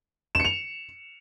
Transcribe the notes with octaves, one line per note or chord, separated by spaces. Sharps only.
C#7 E7 F7